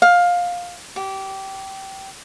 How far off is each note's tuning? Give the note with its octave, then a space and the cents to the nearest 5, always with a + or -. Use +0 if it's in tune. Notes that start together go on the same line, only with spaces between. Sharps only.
F5 +15
G4 -20